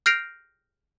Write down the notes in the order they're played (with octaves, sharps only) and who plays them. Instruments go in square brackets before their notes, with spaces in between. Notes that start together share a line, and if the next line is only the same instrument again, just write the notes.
[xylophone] F6 G6 A#6 C7 D7 F7